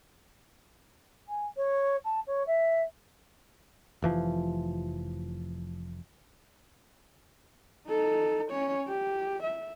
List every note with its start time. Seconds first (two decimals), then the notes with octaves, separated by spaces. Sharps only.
1.29 G#5
1.57 C#5
2.05 A5
2.27 C#5
2.47 E5
4.02 F1 E3 F3
7.88 D#4 A4
8.52 C#4 C#5
8.88 G4
9.43 E5